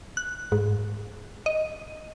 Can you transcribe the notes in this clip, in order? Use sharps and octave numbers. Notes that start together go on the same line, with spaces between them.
F#6
G#2
D#5